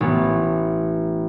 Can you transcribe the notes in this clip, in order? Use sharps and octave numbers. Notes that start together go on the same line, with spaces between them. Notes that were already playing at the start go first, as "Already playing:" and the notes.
A1 B3